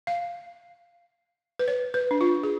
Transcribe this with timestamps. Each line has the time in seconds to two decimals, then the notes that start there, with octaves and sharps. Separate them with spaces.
0.07 F5
1.59 B4
1.68 C#5
1.94 B4
2.11 D4
2.21 F4
2.43 G#4